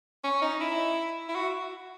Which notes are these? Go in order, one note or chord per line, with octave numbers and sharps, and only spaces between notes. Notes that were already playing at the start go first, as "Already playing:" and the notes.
C#4
D#4
E4
E4
F#4